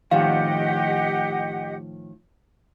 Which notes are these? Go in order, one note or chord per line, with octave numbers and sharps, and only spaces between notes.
A2 D#3 F3 G4 D#5 F5 F#5